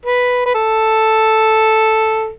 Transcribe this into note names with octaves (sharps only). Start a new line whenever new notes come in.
B4
B4
A4